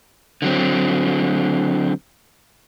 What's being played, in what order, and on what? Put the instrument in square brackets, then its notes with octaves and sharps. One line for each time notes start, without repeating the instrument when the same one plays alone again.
[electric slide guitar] D3 F#3 C4